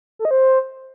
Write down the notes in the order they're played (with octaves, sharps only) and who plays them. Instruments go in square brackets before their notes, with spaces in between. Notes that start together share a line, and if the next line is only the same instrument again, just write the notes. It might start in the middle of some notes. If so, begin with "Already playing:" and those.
[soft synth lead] A4
D#5
C5